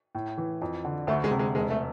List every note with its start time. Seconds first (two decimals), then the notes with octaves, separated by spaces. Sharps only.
0.15 A2
0.38 E3
0.62 F2
0.85 D3
1.07 D2 A3
1.24 G#3
1.31 C3
1.39 G#3
1.55 E1 G#3
1.70 A3